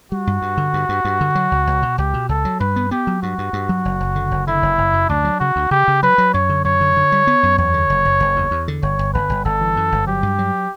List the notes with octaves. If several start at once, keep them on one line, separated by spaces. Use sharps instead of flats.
G3 F#4
G2
G2
D3
G2
G2
G2
D3
F#3
C#2
C#2
B2
C#2 G4
B2
C#2 A4
F#3
G2 B4
B3
B3 G4
F#3
G2 F#4
G2
G2
F#3
F#1
F#1
D3
F#1
D3 E4
F#1
F#1
F#2
D2 D4
F#3
C#3 F#4
D2
C#3 G4
C#3
F#3 B4
F#3
F#2 C#5
D3
F#2 C#5
D3
D3
G3
B3
F#2
E2 C#5
D3
F#1
F#1
F#1
E2
E2
D3
G1 C#5
G1
G1 B4
G1
G1 A4
E3
F#2
G1
F#3 G4
G2
F#3